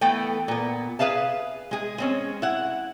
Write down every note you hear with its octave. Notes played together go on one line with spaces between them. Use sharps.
E3 A3 B3 A4 G5
A#2 B3
G#4 B4 E5 F5 A5
G#3 G#4
G#3 C4 C#4
E4 F#5